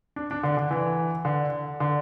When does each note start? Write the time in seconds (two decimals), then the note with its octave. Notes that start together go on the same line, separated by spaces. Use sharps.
0.16 D4
0.31 D4
0.43 D3
0.57 D3
0.71 E3
1.25 D3
1.80 D3